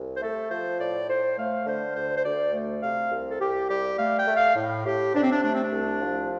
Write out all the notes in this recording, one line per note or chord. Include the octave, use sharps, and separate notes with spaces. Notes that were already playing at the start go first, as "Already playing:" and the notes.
Already playing: C2
C5
A3 A4
F3 C5
A2 D5
A2 C5
A3 F5
D3 C5
D2 C5
C5
D2 D5
A3
C3 F5
C2
A4
C2 G4
G3 G4
A3 F5
G5
A3
F5
A2
A2 G4
C3 D4
C4
D4
A3 D4
C4
D4
C2
F3